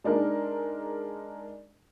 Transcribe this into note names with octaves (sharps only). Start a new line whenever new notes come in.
G#3 D4 D#4 A#4